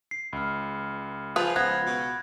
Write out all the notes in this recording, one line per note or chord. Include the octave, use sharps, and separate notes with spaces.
C7
C#2 B5 F6
F3 F4 G#4 B4 F5 G#5 A5
C#2 B3 F5 F#6 G#6 A#6
B2